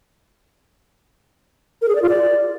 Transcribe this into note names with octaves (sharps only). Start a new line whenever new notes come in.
A#4
G#4
D5
F4
D5